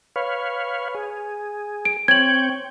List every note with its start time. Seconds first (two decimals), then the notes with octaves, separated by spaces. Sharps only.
0.16 B4 C#5 F5
0.95 G#4
1.85 D7
2.08 C4 C#5 G5 G#6 F#7